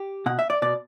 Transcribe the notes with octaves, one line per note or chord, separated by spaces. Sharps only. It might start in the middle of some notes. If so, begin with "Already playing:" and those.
Already playing: G4
B2 F#5
E5
D5
B2 D5